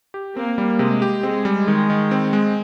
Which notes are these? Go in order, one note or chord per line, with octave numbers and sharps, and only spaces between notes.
G4
A#3 C4
G3
C3 G#3
G4
G#3 C4
G3
D#3 G#3
D#3
C4
G#3